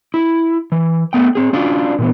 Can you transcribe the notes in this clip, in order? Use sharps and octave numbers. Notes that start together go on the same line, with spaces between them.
E4
E3
A3 B3 G5
C4 G#4
C#4 D4 F4 F#4 D5
A#2 E3 B3